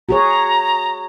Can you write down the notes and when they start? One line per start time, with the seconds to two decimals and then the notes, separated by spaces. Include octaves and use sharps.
0.09 F#4 G#4 C#5 A#5